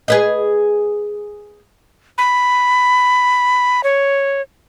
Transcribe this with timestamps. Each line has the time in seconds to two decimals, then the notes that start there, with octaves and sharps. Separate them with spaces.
0.08 G#4 B4 D#5
2.18 B5
3.84 C#5